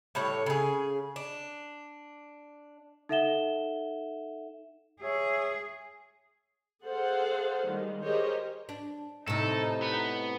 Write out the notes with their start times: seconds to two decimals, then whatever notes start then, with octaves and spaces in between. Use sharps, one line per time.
0.15 A2 G3 C#5
0.46 C#3 G#4
1.16 D4
3.09 D#4 A4 E5 F#5 E7 G7
5.02 G#4 C#5 E5
6.84 G#4 A4 C5 F5 F#5
7.66 D#3 G3 G#3
8.02 G4 G#4 A#4 C5 C#5 D#5
8.69 D4
9.28 A2 C3 D#4 A4
9.82 B3